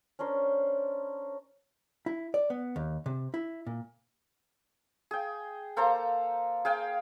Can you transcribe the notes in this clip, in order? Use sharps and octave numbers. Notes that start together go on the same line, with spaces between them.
C#4 D4 A#4 C5
E4
D5
B3
D#2
C3
E4
A#2
G#4 G5
A#3 A4 C5 A#5
G#4 F5 G5